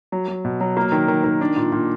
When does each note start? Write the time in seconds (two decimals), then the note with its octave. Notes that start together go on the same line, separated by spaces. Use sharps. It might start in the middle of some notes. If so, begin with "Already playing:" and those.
0.12 F#3
0.28 F#3
0.45 B2
0.61 F#3
0.77 A#3
0.92 D#3
1.08 D#3
1.24 D#3
1.41 D4
1.56 A#2
1.72 A#2